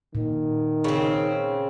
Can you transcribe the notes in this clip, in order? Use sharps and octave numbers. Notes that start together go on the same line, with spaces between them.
A#2 D#3
C#3 C4